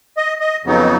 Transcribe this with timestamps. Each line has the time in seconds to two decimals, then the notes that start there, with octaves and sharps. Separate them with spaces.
0.17 D#5
0.40 D#5
0.64 F2 C#3 F#3 B3 D#4